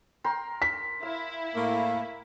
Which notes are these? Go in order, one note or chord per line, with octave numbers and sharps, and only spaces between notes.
A#4 G5 C6
B6
E4 F5
A2 A#3